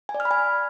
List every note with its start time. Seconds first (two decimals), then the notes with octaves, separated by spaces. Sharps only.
0.09 G#5
0.14 D5
0.20 F6
0.25 B5
0.31 G#5